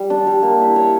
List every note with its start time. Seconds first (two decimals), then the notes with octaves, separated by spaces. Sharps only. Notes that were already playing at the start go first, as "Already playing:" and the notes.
Already playing: G3
0.10 D4
0.27 G3
0.43 A#3
0.60 E4
0.76 C#5